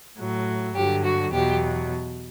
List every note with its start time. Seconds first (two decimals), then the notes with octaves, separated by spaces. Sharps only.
0.18 A2 F#3
0.75 G2 D3 F#3 G4
1.04 F#4
1.32 E2 B2 F#3 G4